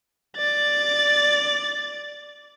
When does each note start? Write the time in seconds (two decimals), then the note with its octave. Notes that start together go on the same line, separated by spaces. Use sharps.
0.37 D5 A6